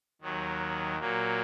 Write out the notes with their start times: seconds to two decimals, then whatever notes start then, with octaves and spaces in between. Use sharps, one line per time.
0.21 D#2 D#3 F#3
0.99 A#2 F#3 A#3